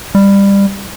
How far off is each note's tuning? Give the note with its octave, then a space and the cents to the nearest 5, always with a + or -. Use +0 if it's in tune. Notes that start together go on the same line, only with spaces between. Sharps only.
G3 +20